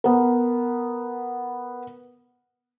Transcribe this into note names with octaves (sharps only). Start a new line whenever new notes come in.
B3 A#4